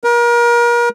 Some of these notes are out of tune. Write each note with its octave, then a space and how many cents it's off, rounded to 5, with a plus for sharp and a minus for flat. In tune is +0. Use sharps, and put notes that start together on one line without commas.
A#4 +35